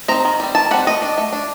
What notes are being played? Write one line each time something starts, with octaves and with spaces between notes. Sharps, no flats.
C4 D#4 A#5
D#3
G3 C4
D#3 A5
G3 C4 F#5
A3 D#5
D4
A3
D4